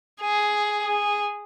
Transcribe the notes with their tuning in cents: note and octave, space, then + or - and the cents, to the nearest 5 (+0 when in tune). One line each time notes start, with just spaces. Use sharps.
G#4 +5
G#4 -10